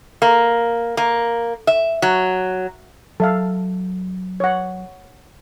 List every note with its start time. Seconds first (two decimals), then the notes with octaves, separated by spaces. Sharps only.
0.22 A#3
0.97 A#3
1.67 E5
2.02 F#3
3.20 F#3 A4 E5 F5
4.40 C#5 F#5